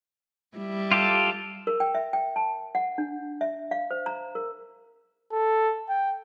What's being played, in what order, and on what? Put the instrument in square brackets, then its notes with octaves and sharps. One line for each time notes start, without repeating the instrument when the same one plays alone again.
[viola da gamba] G3 E4
[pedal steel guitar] F4 G4 A4
[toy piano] A#4
G5
E5
G5
A5
F#5
D4
E5
F5
C5
A#5
A#4
[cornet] A4
G5